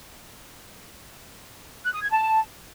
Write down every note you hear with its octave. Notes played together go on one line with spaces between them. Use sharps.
F#6
D#6
G#6
A5